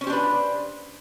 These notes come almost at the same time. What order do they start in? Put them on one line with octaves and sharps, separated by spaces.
C#4 C5 G4 D4 B4